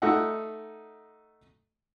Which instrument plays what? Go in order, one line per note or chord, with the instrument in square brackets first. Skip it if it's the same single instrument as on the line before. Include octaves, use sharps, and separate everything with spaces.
[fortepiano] A3 D#4 D#5 E5 F#5